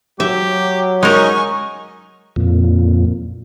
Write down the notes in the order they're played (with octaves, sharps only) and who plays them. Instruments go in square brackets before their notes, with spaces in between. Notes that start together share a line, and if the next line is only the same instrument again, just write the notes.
[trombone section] F#3 [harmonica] G4 [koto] E5
[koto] G#3 A#4 [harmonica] C#4 D#4 D#5 [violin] G#5 C#6
[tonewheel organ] F2 A#2